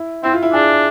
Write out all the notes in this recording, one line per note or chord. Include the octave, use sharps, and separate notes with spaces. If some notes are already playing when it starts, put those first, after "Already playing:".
Already playing: E4
C4 E4
F4
E4
D4 G#4